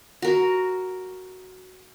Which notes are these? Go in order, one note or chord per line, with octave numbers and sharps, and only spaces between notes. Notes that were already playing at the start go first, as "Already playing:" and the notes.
F#4 A#4